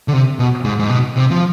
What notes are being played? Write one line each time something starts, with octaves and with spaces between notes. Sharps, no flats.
D3
C3
B2
G#2
G#2
B2
C3
F3